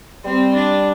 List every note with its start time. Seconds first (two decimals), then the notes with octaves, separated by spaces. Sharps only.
0.25 G3 C4
0.54 D4